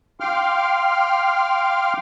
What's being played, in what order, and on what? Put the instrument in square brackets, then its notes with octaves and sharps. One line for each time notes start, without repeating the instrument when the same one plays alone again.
[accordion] F5 G5 C6 D6 F6